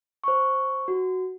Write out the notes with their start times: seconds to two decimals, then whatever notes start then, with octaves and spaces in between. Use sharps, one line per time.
0.24 C5 C#6
0.88 F#4